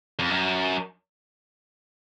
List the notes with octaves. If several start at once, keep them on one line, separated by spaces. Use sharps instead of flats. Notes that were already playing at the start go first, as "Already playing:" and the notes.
F2
F#2